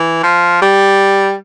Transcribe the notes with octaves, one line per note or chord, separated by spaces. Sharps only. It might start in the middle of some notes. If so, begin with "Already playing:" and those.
Already playing: E3
F3
G3